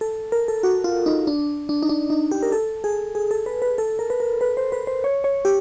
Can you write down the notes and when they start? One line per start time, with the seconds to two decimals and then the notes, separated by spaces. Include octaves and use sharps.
0.01 A4
0.32 A#4
0.48 A4
0.63 F#4
0.84 F4
1.06 D#4
1.27 D4
1.69 D4
1.83 D#4
1.89 D4
2.10 D#4
2.31 G4
2.43 A#4
2.52 A4
2.84 G#4
3.15 G#4
3.31 A4
3.46 B4
3.62 B4
3.78 A4
3.99 A#4
4.10 B4
4.20 A#4
4.41 B4
4.57 C5
4.72 B4
4.87 C5
5.04 C#5
5.24 C#5
5.45 G4